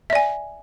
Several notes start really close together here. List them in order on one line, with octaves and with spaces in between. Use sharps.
E5 D5 G#5